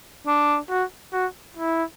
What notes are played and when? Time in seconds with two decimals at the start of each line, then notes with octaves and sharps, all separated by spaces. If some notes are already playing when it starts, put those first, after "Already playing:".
0.27 D4
0.70 F#4
1.13 F#4
1.57 E4